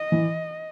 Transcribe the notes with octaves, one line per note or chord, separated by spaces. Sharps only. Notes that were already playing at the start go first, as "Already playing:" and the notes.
Already playing: D#5
E3